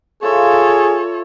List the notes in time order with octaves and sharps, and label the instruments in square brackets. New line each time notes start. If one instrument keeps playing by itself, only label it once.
[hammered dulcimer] F4 E5 [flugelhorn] G#4 [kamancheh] A4 C#5